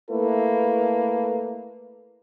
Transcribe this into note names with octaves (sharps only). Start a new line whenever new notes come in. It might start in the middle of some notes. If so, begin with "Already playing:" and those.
A3 A#3 E4 A4 B4